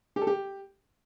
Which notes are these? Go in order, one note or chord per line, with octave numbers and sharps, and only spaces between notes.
G4
A4
G4